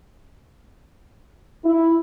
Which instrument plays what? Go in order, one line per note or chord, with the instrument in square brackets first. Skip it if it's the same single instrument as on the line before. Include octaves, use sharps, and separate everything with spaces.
[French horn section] E4